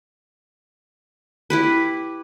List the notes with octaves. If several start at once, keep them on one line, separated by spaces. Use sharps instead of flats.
E4 G4 B4